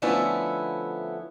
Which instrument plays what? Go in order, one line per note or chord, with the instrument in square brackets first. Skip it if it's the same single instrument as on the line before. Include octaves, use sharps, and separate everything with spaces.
[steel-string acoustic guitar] D3 F3 A3 B3 C#4 E4